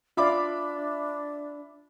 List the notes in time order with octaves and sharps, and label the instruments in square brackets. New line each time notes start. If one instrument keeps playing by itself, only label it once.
[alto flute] D4 [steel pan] F4 D5 F5 [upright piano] E5 B5 D6